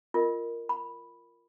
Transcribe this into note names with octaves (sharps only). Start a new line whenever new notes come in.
F4 A#4 D#5
B5